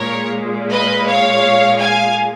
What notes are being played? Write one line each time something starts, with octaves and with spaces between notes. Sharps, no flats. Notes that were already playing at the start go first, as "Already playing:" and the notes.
Already playing: A#2 G#3 A#4 C#5
B4 D#5
C#5 F5
F5 G#5